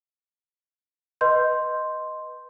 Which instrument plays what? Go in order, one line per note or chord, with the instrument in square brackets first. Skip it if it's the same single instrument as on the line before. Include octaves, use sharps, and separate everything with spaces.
[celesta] B4 D#5 C6 G6